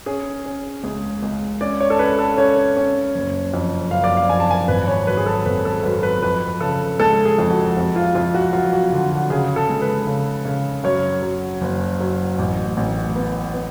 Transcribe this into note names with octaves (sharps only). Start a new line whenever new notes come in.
C#4 G#4
C#4
C#2 G#4
C#2
C#4 D5
C#5
A4
C#4 B4
A4
C#4 C#5
C#4
F#1
F2
F#1 F5
D5
F5
F2 G#5
A5
G#5
G#1 B4
C#5
F#2 B4
G#4
A4
G#1 B4
A4
F#2 B4
B4
F2 B4
C#3 A4
G#3 A4
G#4
F2
F#4
F2
F4
F2 F4
F#4
F#3 F4
F#4
D3
F#4
C#3 G#4
A4
G#3
B4
C#3
C#3
F#2 C#5
F#3
F#1
F#3
A1
A1
B3
B3